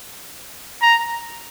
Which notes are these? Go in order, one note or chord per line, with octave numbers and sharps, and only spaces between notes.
A#5